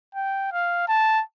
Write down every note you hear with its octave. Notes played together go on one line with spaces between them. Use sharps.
G5
F5
A5